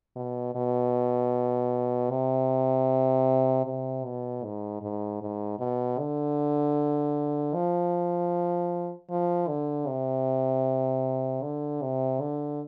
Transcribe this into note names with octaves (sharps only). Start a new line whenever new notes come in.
B2
B2
C3
C3
B2
G#2
G#2
G#2
B2
D3
F3
F3
D3
C3
D3
C3
D3